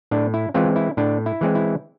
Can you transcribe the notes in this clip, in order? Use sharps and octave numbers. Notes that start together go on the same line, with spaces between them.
A2 D4
E4
E3 G#3 C4 F4
E4
A2 D4
E4
E3 G#3 C4
E4